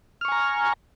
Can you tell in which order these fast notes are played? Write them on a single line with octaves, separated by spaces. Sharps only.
F6 C#6 G#5 A#5